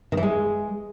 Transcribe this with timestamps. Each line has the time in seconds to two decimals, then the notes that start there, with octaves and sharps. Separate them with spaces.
0.12 D#3
0.17 E3
0.23 G#3